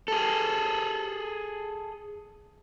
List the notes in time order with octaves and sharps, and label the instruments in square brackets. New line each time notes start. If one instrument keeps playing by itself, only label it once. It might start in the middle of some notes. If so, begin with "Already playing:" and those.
[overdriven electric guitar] G#4 A4